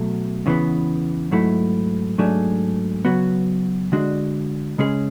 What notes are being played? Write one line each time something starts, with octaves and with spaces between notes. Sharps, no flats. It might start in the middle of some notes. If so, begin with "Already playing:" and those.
Already playing: B2 F#3 A3
E2 C#3 E3 B3
G#2 F#3 A3 E4
G#2 F#3 A3 D4 G#4
C#3 F#3 B3 F#4
D3 G#3 D4 F#4
C#3 G#3 C#4 G#4